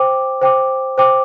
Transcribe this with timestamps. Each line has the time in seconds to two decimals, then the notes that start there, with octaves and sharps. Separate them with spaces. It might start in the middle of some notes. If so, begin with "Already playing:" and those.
Already playing: C5 G5 D6
0.42 C5 G5 D6
0.98 C5 G5 D6